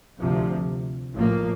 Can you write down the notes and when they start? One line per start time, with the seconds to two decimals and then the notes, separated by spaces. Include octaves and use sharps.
0.20 D2 C3 F3
1.14 A1 A2 F3 A#3